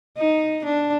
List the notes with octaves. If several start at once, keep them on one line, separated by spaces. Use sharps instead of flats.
D#4
D4